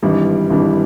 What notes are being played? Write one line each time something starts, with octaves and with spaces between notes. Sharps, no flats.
G#1 G2 E3 G3
G#1 G2 E3 G3